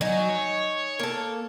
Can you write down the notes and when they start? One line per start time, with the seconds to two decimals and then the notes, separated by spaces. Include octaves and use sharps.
0.01 F#3 D#4 G#5
0.30 C#5
0.99 A#3 A4